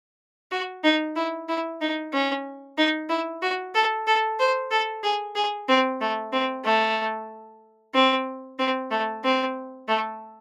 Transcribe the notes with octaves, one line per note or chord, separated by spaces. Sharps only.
F#4
D#4
E4
E4
D#4
C#4
D#4
E4
F#4
A4
A4
C5
A4
G#4
G#4
C4
A3
C4
A3
C4
C4
A3
C4
A3